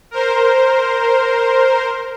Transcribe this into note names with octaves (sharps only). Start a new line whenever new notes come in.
A#4 C5